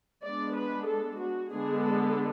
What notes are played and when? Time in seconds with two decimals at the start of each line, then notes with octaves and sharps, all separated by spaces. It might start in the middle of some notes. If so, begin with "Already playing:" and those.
0.24 G#3 B3 D4 D5
0.57 B4
0.88 A4
1.20 F#4
1.52 D3 G#3 B3 D4 G#4
1.85 A4